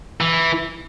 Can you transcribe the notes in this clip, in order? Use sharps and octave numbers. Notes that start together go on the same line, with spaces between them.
E3